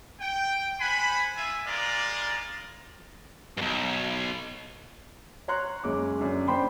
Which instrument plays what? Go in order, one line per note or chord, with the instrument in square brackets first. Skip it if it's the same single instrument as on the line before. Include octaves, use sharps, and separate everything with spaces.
[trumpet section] G5
C5 F#5 G#5 B5
F4 E5 G#5
G3 G#3 F4 A#4 D5
[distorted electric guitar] B1 G2
[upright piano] C#5 A#5 C6 F#6
F#1 G#3 C#4 D6
F#2 D3
F#1 D4 C5 G5 B5 C6